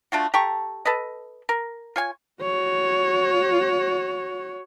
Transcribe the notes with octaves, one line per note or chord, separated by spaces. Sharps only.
A3 D4 F4 F#4
G4 A4 A#5 C#6
A4 B4 D#5
A#4
F4 C#5 G#5
F#4 C#5